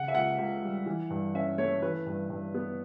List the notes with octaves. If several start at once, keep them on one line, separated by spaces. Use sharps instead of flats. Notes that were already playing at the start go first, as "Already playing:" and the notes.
Already playing: C#3 F#5
E5
C#2 F#5
C#2
G3
E3
G2
C#4 E5
A3 C#5
E3 B4
G2
G2
B3